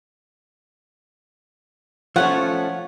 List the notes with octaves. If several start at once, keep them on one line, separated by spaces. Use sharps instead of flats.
F3 A3 C#4 C#5 F#5